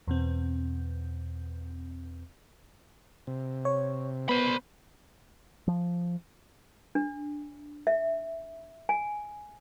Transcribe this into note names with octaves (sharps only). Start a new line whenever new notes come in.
E2 B2 C4
C3
C#5
B3 C5 B5
F3
D4
E5
G#5